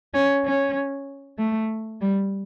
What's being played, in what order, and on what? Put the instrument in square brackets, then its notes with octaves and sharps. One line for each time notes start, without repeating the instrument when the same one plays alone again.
[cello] C#4
C#4
A3
G3